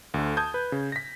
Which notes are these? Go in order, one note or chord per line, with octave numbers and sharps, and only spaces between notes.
D2 D3
A5 D#6 G6 G#6
B4
C#3
A#6 B6